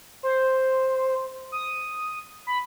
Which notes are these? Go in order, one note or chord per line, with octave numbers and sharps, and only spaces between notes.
C5
D#6
B5